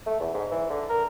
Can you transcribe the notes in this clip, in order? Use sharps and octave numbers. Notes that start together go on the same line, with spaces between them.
A3
E2
G#2
E3
D3
A#4